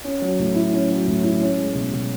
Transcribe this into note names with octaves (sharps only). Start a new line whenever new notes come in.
C#4
F#3
A2
E4
C#4
F#3
A2
E4
C#4
G#3
B2
B2